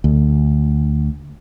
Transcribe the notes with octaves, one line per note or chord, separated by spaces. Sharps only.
D2